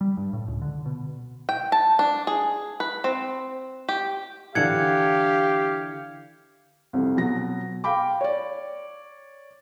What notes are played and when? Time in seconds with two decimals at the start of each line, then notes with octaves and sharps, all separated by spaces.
0.01 G3
0.17 G2
0.33 A2
0.48 C#2
0.62 D3
0.86 B2
1.49 G5
1.72 A5
1.99 D4
2.27 G#4
2.80 B4
3.04 C4
3.89 G4
4.55 D3 E3 G4 F5 F#5 G#6 C#7
6.93 C2 F2
7.17 B2 F#3 A#6
7.84 F5 G5 B5 D6
8.21 C#5 D5